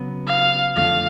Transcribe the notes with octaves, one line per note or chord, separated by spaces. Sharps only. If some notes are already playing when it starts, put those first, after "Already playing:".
Already playing: C#3 F#3 B3
F5
F2 D3 F3 A3 F5